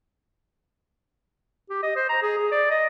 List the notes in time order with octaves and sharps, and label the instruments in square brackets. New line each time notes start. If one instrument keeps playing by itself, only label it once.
[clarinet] G4
D#5
C5
A#5
G#4
G#4
D5
D#5